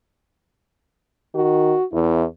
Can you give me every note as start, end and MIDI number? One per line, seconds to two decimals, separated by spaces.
1.35 1.75 51
1.35 1.84 66
1.93 2.24 40
1.93 2.26 64